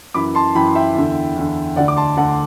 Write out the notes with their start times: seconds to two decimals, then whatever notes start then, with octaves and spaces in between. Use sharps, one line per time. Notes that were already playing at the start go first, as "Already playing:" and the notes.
0.14 F#2 E3 B5 D6
0.35 A5 C6
0.55 F#2 E3 G5 B5
0.75 E5 G5
0.95 E2 D3
1.36 E2 D3
1.76 D2 D5 F#5
1.80 D3
1.88 D6
1.97 A5 C6
2.17 D2 D3 F#5 A5